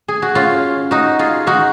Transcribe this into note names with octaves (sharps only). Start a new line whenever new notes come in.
G#4
F#4
C#4 F4
D#4 F#4
F4 G#4
D#4 F#4